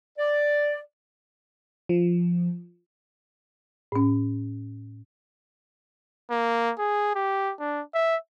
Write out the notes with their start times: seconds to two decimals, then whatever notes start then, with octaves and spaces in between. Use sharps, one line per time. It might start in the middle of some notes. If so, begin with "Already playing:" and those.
0.18 D5
1.89 F3
3.92 A2 C#4
6.30 A#3
6.78 G#4
7.15 G4
7.59 D4
7.94 E5